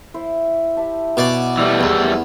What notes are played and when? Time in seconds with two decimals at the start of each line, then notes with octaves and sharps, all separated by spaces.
0.14 E4 C5
0.77 G4 E5 A5
1.17 B2 F#3 D5 F#5 G#5
1.58 E3 G3 A3
1.81 E2